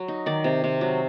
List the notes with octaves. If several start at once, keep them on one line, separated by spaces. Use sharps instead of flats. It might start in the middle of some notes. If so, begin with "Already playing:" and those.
Already playing: F#3
D#4
D#3 D5
C3
C3
F#3